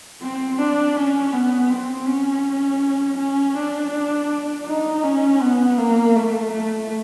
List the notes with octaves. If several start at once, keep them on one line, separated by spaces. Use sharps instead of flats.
C4
D4
C#4
B3
C4
C#4
C#4
D4
D#4
C#4
B3
A#3
A3
A3